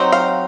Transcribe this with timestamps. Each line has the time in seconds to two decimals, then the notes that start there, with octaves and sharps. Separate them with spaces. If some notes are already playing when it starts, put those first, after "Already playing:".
Already playing: F#3 C4 D#4
0.12 F5